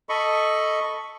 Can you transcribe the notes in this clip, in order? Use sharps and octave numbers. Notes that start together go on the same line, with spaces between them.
A4 D#5 B5 C#6